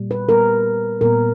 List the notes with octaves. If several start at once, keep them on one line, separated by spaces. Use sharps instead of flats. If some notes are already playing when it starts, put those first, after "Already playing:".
Already playing: A#2 G3
B4
A#2 G3 B3 A#4
A#2 G3 B3 A#4